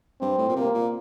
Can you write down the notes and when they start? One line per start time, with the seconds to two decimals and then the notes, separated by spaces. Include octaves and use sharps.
0.21 G2 C4
0.38 A2
0.49 A#2
0.56 C3 A#3
0.74 A#2